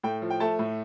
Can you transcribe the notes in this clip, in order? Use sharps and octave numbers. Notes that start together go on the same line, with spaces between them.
A2 G5
F3
G5
A3 A5
A2